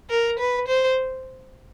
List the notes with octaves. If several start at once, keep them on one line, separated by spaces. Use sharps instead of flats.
A#4
B4
C5